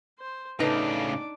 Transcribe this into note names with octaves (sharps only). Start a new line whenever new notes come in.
C5
A2 C#3 D4 D#4 A4 B4 D6